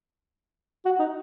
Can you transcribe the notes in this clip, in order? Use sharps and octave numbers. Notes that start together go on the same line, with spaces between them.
F#4
D#4